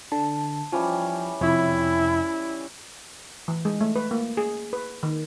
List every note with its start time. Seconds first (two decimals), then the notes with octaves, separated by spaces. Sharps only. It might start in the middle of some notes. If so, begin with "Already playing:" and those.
0.12 D3 A5
0.72 E3 F3 G3 C#4
1.41 F2 C3 E4 C#5 E5
3.48 E3
3.65 G#3
3.81 A3
3.96 B4
4.11 A#3
4.37 G#4
4.73 B4
5.03 D#3